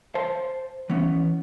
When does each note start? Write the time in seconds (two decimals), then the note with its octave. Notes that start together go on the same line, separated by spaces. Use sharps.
0.15 C5 A5
0.90 E3 B3 C#4